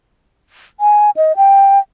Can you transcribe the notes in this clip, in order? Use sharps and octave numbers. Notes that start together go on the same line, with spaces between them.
G#5
D#5
G5